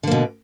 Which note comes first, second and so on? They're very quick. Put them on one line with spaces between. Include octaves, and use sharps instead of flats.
D3 A#3 B2